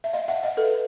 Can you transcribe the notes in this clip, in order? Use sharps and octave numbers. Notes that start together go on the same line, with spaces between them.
E5
D#5 F5
E5 F#5
D#5 F5
A4 B4